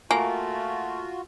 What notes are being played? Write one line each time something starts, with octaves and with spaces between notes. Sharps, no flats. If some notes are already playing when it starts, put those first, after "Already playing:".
A3 A#3 F4 F#4 G#5